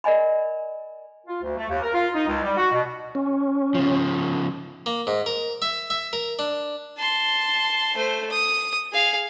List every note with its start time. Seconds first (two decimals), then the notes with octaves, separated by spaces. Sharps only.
0.04 A#4 D5 D#5 G#5 B5
1.27 F4
1.43 D2
1.57 A3
1.70 D#2
1.82 A#4
1.94 F4
2.15 D#4
2.28 C#2
2.43 G3
2.57 F#4
2.72 B2
3.15 C#4
3.75 C#3 F3
4.86 A#3
5.07 G#2
5.26 A#4
5.62 E5
5.90 E5
6.13 A#4
6.39 D4
6.98 A5 C6
7.96 A3 C5
8.30 D#6
8.93 G#4 F5